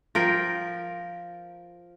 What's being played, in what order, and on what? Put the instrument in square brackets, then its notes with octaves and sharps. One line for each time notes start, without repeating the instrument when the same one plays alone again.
[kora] F3 A#4 G5